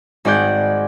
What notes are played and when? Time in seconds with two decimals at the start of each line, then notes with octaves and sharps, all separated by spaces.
0.25 G#1 D#4 G#4 D5 F#5 G6